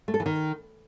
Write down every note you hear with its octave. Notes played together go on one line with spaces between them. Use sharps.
A3
A4
E3
D#3